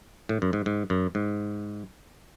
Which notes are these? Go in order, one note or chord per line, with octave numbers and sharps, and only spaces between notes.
A2
F#2
G#2
G#2
F#2
G#2